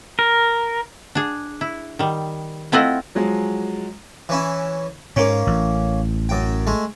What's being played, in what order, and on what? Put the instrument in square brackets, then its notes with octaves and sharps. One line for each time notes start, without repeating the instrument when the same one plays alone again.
[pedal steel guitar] A#4
[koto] D4 G#4
E4
D#3 G3
A3 C4 E4 F4 D#5 F#5
[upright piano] F3 F#3 G#3
[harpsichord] E3 C#4 E4
[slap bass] G#2 [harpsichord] A#3 C#4
[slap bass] A1
[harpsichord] F#2 G5
G#3 A3